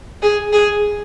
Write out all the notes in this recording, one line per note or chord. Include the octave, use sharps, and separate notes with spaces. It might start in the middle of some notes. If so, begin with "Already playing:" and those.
G#4
G#4